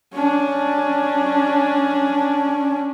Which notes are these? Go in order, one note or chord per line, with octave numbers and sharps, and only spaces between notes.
C#4 D4